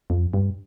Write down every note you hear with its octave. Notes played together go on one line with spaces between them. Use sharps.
F2
G2